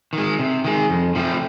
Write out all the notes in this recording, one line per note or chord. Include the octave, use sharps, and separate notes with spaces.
D#3 G#3
C3
D#3 G#3
F2
C3 F3 A3 C4